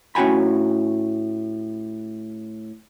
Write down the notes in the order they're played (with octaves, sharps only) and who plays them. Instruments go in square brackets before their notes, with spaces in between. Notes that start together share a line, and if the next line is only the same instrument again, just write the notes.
[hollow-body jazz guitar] A2 C#4 F#4 G5 G#5 B5